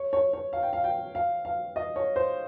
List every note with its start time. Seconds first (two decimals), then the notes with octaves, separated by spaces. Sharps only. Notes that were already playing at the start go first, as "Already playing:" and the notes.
Already playing: C#5
0.13 C#5
0.33 C#5
0.53 F5
0.63 G5
0.73 F5
0.84 G5
1.15 F5
1.45 F5
1.76 D#5
1.96 C#5
2.16 C5